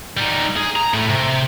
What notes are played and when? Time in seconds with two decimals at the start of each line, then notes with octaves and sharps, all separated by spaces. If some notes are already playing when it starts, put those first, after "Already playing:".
0.17 G3 D#4
0.56 G#4
0.76 A#5
0.94 A2
1.09 C3